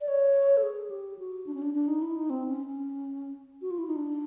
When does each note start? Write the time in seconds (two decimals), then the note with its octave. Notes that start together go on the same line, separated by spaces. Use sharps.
0.01 D5
0.08 C#5
0.57 A4
0.63 G#4
0.90 G4
1.19 F#4
1.47 D4
1.54 C#4
1.62 D4
1.75 D4
1.88 D#4
2.02 E4
2.16 D#4
2.30 C4
2.48 C#4
2.67 C#4
3.62 F#4
3.71 F4
3.78 E4
3.87 D#4
3.96 D4